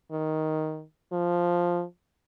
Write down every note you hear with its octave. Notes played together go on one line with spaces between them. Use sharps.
D#3
F3